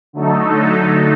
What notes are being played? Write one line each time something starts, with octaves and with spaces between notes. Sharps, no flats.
D3 F#3 A3 D#4 A4